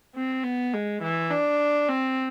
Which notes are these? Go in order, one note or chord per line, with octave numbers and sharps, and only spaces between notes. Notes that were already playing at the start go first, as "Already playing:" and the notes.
C4
B3
G#3
E3
D4
C4